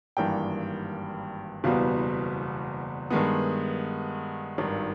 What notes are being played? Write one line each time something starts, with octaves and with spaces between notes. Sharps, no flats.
G#1 G2 E3 G3 A#3 G5
F#1 E2 B2 G3 B3 F5
G2 D#3 G#3 B3
G#1 G2 D#3